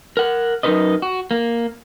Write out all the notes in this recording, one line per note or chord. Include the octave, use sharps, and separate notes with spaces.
A#4 F#5
F#2 E3 D#4 A#4 B4 D#5
F#4
A#3